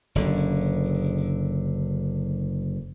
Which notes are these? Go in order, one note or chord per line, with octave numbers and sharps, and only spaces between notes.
F#1 D3